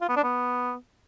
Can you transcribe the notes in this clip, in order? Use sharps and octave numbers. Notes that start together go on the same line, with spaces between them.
F4
B3
D4
B3